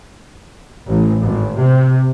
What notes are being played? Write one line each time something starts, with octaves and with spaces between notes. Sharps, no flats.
A1
G#1
C3